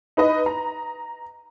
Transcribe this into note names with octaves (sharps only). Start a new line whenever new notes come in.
D#4 B4 D#5
A#5